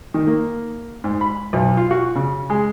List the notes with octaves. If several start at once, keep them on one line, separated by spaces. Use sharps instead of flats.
D#3
A#3
G#2
B5
B1
F4
F#4
C#3
G#3